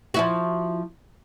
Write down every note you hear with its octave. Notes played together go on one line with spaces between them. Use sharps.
F3 E4 F#4